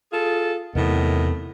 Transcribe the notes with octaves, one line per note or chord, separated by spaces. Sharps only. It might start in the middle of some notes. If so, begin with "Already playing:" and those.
F4 G#4 A4
E2 A2 C3 D#3 B3